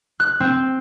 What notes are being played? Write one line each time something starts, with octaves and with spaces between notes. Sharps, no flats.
F#6
C4